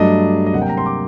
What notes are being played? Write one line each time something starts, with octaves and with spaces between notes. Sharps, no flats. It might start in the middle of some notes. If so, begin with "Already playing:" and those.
Already playing: G2 F#3 A3 D4 D#5
D#5
C3 F#3 A#3 F#5
G5
A#5
C6
D6